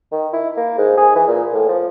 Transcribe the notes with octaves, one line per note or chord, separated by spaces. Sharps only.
D#3
E4
A#3
G#2
G#4
E3
A#2
A2
F3